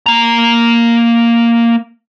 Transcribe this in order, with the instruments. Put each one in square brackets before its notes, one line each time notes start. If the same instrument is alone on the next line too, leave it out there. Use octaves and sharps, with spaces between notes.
[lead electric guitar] A#3 A#5